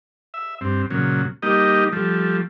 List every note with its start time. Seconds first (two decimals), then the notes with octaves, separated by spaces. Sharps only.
0.34 E5
0.61 G2 C4
0.90 A#2 C#3 F#3
1.42 G3 A#3 D#4 G4 D#5
1.93 F3 G3 A3